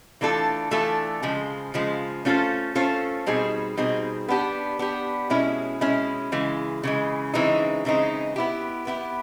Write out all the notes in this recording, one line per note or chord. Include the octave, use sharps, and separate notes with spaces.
E3 A3 D4 F4 A4
E3 A3 D4 F4 A4
C#3 F3 G#3
C#3 F3 G#3
A3 C#4 F4 A4 C5
A3 C#4 F4 A4 C5
B2 G3 C4 D#4 G#4
B2 G3 C4 D#4 G#4
B3 D4 G4
B3 D4 G4
B2 G#3 C#4 E4
B2 G#3 C#4 E4
C#3 E3 G#3
C#3 E3 G#3
C#3 E3 G#3 C4 D#4
C#3 E3 G#3 C4 D#4
B3 E4 G4
B3 E4 G4